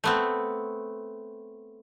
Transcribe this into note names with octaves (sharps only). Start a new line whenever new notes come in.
A3 B3 C4